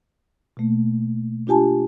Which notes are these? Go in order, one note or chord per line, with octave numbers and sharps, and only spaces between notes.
B2 A3 A#3
D4 F4 G4 G#5 A5